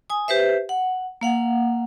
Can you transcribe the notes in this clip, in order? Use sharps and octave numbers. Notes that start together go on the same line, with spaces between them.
G#5 D#6
G4 B4 C5 E5
F#5
A#3 F5 F#5